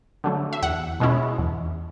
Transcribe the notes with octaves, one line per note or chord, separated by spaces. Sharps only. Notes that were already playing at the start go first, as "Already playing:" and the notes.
D3 F#3 A3
E5
E2 F#5
B2 G#3 C#4 E4
E2